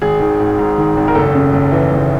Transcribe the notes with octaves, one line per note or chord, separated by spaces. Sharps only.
G#1 G#4
D#3
G#2
G#2
D#3
G#1
A#4
F#1 A4
C#3
F#1
E3
F#1